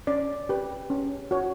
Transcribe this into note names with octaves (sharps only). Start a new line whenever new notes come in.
C#4 D5
G4 B4
C#4
F#4 C#5